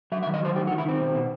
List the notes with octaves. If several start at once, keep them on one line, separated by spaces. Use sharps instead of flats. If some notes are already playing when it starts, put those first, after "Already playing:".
F#3 E5
E5
D#3
D#5
F#3 C5
D#3 G4
F#4
D#3
E4
D#3 C4
B2
B2